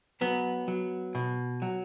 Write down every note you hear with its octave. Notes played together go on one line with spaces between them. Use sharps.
F#3 B3
F#3
B2
F#3